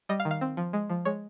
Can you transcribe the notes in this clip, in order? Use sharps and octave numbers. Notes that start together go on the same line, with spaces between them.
G3 D#5
F5
D#3
F5
C4
F3
G#3
F3
G#3 C#5